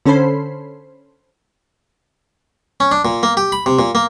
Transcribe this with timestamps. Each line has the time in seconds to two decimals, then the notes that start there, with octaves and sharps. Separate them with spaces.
0.05 D3 C#4 A4 C5 B5 C7
2.80 C#4
2.92 D4
3.05 A#2
3.23 A#3
3.37 G4
3.52 B5
3.66 C3
3.79 A#2
3.95 A#3